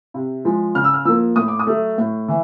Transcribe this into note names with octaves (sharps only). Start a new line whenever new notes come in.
C3
F3 G#3
C#3 F6
E6
F6
F3 A#3 E6
A2 D#6
D6
D#6
F#3 A3
A2
E3